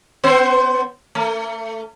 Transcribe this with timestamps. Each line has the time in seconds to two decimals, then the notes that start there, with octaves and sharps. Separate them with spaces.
0.24 B3 C5
1.15 A3